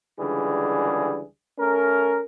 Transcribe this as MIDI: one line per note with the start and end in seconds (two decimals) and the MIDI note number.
0.19 1.23 37
0.19 1.23 50
0.19 1.23 52
0.19 1.23 55
0.19 1.23 68
1.59 2.23 57
1.59 2.23 61
1.59 2.23 70